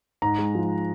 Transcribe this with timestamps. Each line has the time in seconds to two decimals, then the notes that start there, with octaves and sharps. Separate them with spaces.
0.22 G#2 A#5
0.38 G#3
0.55 F3